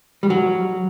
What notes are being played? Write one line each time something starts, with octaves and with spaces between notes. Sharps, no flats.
G3
F#3